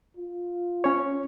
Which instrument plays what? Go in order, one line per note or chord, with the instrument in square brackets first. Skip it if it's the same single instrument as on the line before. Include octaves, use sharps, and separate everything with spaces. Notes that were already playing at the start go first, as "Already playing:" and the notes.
[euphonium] F4
[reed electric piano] C#4 C#5